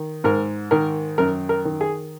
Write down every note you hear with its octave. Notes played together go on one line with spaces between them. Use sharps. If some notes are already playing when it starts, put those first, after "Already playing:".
Already playing: D#3
G#2 A#4
D#3 A#4
F#2 A#4
A#4
D#3
G#4